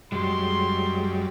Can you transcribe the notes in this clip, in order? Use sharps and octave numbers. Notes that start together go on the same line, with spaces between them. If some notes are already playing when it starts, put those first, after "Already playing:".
F#2 G3 G#3 C6